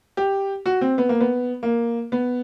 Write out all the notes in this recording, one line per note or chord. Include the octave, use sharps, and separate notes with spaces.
G4
F#4
C4
B3
A#3
B3
A#3
B3